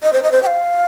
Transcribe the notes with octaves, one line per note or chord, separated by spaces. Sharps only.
D#5
C5
D#5
C5
G5
F5